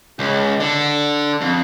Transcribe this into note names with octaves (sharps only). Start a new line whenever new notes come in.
C#2
D3
F2